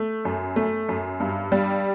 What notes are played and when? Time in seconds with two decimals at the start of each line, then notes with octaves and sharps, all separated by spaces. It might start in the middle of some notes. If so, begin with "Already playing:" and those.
Already playing: A3
0.25 F#2
0.56 A3
0.89 F#2
1.20 G2
1.52 G3